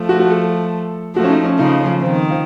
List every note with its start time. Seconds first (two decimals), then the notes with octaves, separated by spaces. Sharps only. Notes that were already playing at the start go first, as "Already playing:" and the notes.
Already playing: F3 A3
0.09 F#4
0.20 F#4
0.30 A4
1.15 F3 A3 F#4
1.24 C#4
1.30 D#4
1.44 C#4
1.58 C#3 F3 D#4
1.80 C#4
2.01 D#3 C4
2.31 F3